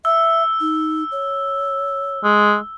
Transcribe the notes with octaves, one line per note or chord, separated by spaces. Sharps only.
E5 E6
D#4
C#5
G#3